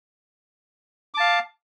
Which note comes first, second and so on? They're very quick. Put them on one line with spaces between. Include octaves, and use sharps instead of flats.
D6 A5 F5